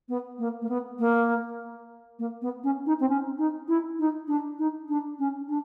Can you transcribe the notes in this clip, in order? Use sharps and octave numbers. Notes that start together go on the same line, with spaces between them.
B3
A#3
A#3
B3
A#3
A#3
B3
C#4
D#4
C4
C#4
D#4
E4
D#4
D4
D#4
D4
C#4
D4